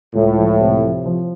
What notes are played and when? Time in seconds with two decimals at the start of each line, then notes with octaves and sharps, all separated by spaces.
0.15 C#2 A2
0.37 F3
0.60 C3
0.83 F3
1.06 F3